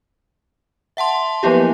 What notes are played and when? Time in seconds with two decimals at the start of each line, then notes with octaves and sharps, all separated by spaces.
0.97 E5 F#5 A5 C6
1.43 F3 F#3 A#3 B3 E4 G4